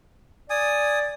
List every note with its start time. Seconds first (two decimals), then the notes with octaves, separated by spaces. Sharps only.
0.50 D5 G#5 D#6